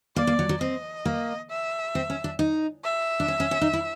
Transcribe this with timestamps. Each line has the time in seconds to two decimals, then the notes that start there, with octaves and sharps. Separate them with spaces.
0.16 A#3 D5
0.27 A#3
0.39 F#3
0.49 F#3
0.61 C4 D#5
1.05 A#3
1.50 E5
1.95 C4
2.10 C#4
2.24 D4
2.39 D#4
2.84 E5
3.20 D4
3.28 C#4
3.40 C#4
3.51 C#4
3.61 D#4
3.73 E4